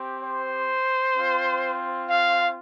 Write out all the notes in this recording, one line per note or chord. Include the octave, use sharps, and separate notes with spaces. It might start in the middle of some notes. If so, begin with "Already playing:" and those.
Already playing: C4 G4
C5
C4 F4
F5